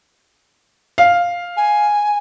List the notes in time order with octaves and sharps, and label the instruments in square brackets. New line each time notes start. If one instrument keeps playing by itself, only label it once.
[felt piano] F5
[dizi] G#5